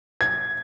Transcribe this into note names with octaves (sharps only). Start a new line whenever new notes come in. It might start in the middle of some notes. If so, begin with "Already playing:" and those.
G#6